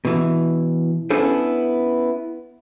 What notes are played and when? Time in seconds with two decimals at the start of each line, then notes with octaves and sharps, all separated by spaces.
0.05 B2 E3
1.10 B3 C#4 D4 E4 A4 C5